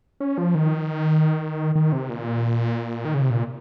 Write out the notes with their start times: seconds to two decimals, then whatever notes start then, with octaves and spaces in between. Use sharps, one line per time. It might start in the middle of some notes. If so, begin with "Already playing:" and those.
0.20 C#4
0.38 F3
0.55 D#3
1.75 D#3
1.92 C3
2.10 A#2
3.05 D#3
3.14 C#3
3.22 C3
3.30 A#2